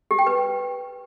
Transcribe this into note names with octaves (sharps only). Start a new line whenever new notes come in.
G4
G5
B4